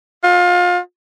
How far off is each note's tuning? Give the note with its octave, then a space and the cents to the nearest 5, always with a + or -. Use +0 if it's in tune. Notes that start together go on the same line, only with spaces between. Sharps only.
F4 +30